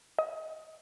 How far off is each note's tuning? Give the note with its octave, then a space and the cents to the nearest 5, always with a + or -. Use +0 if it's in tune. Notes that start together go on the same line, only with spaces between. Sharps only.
D#5 +25